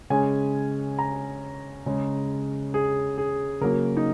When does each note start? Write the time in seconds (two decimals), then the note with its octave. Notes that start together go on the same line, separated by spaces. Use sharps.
0.10 C#3 G#3 C#4 G#5
0.99 A#5
1.86 C#3 G#3 C#4
2.74 G#4
3.18 G#4
3.61 C#3 F#3 A#3 A#4
3.97 D#4